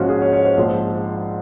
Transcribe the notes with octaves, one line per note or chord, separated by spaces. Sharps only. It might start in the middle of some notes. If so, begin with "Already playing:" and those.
Already playing: A#1 G#2 F3 C#4 F4 F#4
G#4
C#5
C#5
C5
A#1 G#2 F3